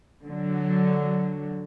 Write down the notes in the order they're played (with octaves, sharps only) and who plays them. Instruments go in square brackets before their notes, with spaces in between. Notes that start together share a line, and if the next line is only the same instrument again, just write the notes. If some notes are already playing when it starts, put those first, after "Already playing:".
[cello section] D3 F#3